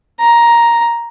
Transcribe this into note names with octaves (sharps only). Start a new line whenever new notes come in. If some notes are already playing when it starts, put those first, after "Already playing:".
A#5